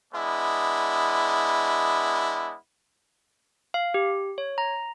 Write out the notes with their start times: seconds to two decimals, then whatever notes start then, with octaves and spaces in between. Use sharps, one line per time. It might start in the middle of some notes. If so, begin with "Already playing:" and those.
0.13 G#3 B3 D4 E4
3.74 F5
3.94 G4
4.38 C#5
4.58 A#5